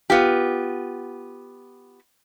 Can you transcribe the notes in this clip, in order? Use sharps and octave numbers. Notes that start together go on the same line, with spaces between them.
B3 F4 G4